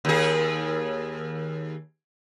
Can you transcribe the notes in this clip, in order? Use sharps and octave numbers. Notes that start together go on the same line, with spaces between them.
D#2 G#4